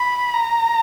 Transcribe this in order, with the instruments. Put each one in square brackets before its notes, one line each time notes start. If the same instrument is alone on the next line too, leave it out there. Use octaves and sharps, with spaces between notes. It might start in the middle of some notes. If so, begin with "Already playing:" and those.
Already playing: [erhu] B5
A#5